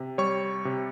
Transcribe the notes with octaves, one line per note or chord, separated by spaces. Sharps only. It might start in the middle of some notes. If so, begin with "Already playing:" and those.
Already playing: C3
G3 C#5 C#6
C3